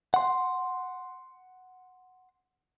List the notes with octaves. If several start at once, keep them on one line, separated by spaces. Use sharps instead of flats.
F#5 C6